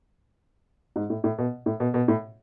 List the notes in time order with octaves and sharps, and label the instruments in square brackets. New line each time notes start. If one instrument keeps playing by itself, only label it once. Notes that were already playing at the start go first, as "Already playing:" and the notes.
[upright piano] G#2
A2
A2
B2
A2
B2
B2
A2